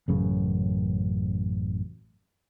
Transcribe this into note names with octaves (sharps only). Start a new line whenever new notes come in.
A1 F#2 C#3